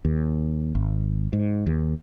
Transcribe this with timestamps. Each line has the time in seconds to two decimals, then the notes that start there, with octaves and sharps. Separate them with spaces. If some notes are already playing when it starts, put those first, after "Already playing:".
0.05 D#2
0.75 G#1
1.33 G#2
1.67 D#2